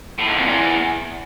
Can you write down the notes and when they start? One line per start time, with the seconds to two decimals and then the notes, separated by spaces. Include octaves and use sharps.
0.18 A2
0.27 G#2
0.36 F2
0.45 E2